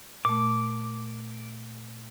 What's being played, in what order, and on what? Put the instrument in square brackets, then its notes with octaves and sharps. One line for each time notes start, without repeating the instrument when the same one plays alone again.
[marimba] A#2 A3 [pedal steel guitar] D6